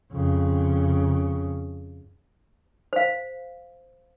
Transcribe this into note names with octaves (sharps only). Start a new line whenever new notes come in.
F2 C#3
C5 F5